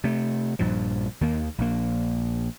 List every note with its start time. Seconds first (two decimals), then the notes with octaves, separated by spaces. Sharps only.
0.04 C3 A3
0.59 A#1 G2 A#2 F3
1.21 D#2 D#3 A#3
1.58 A#1 A#3